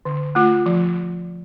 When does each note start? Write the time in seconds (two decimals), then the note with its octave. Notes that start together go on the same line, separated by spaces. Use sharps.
0.05 D3
0.35 A3 F4
0.66 F3